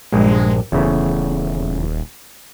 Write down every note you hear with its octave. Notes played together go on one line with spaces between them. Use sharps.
A#1 G2 G#3
D#1 E2 C#3 A3